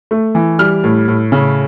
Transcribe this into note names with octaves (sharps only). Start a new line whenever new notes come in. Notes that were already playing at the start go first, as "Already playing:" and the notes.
A3
E3
G3 F6
A2
A2
C#3